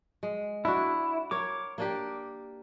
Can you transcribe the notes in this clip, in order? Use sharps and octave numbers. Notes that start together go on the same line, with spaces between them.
G#3
D4 E4 F#4
A#4 C#5 D6
A#3 D4 G4